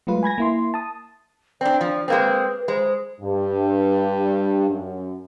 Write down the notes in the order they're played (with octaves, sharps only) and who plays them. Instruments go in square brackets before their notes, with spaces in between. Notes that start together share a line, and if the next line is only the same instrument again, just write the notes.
[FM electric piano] F#3 G#3 A3 F4 B4
G#5 B5 G#6 A#6
A#3 E4 C6
A5 D#6
[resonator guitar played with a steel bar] C4 D4 [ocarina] D5
[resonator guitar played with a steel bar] F3
[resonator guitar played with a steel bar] G#3 A#3 C4 [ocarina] B4
[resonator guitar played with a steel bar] G#3 [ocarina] C5
[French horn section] G2
F#2